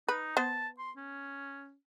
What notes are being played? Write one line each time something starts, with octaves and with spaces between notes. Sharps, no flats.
D#4 B4
B3 C5 A5
C6
C#4